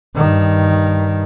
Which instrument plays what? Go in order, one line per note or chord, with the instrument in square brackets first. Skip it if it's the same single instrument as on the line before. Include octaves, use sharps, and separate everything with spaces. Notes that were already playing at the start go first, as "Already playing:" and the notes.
[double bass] G2 D#3